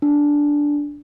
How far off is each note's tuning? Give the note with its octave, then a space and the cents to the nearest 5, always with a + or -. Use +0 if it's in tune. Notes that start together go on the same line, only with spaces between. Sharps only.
D4 -5